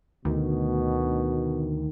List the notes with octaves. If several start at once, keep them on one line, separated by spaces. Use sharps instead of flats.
D2 B2 D#3